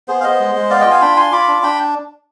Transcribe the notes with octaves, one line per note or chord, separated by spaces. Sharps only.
B3 G#4 C5
F5
B3 C5 D#5
G#3
G#3
B3 D5 F5
F4 D#5 G5
F5 G#5
D4 G5 B5
F4 G#5 C6
F4 B5 D6
D4
D4 G5 B5